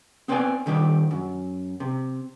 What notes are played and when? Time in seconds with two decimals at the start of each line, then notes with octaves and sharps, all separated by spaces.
0.28 B3 C4 B4 C5 D5 G#5
0.66 D3 D#3 G3 D#4 G4
1.11 F#2
1.80 C3